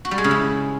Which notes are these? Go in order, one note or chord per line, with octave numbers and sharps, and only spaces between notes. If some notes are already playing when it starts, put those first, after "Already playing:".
F#4
G3
G#3
C#3
E4